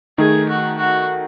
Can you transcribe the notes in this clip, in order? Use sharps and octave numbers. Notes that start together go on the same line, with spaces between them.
D#3 A3 D#4 G#4
F#4
F#4